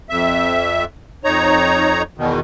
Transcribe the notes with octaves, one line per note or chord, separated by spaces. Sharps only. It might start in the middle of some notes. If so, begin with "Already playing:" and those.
F2 E5
F2 D#4 C#5 A#5
E2 B2 D#3